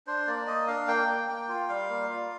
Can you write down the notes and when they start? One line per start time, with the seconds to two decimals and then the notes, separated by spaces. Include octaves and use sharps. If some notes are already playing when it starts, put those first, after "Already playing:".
0.07 D4 C5
0.27 A#3 D5
0.47 A#3 D#5
0.67 D4 F5
0.88 A#3 G5
1.08 A#3
1.28 A#3 G5
1.49 F4
1.69 G3 F5
1.89 A#3
2.09 F4